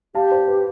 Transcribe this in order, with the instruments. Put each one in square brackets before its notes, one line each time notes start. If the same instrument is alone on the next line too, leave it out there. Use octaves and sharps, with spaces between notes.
[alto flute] G4 [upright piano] F5 A5
[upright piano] C5
B4